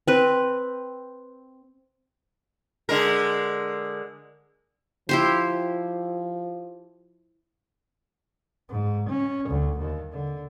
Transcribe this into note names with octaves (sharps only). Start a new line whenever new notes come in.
C4 B4
D3 G#3 A#4
F3 E4 G4 C5
G#2
C#4
D2
D#2
D3